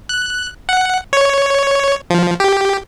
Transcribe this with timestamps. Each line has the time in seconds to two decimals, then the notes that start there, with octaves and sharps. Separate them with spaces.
0.09 F#6
0.69 F#5
1.13 C#5
2.10 F3
2.40 G4